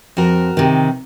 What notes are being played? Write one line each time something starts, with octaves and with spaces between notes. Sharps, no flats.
F2 F#4 A#4
C3 D#3